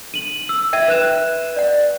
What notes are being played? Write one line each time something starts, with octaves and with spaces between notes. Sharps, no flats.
D#7 F#7
E6
E5 G5 G#6 D#7
B4 F#6 E7
D5 F#5